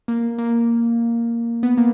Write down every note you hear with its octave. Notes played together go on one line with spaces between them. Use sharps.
A#3
A#3
B3
A#3